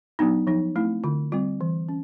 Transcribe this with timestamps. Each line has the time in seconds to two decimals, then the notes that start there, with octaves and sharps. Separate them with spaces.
0.19 F#3 B3 D4 D#4
0.47 F3 D#4
0.76 A3 C4 E4
1.04 D3 F4
1.32 G3 C4 F4
1.61 E3
1.89 C#4